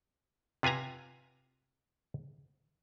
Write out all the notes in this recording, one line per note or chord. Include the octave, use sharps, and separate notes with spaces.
C3 F4 B4 G#5 A#5